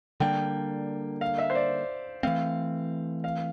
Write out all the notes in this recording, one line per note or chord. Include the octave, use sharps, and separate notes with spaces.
D3 G3 A#3 D4 G5
F5
E5
C5
D5
E3 A3 C4 F5
F5